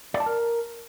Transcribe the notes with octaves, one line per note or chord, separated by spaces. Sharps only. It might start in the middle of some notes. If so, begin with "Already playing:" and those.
D5
A5
A#4